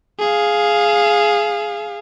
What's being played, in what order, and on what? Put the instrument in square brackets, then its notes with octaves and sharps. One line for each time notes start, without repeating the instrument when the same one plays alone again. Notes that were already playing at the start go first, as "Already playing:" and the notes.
[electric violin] G#4 F5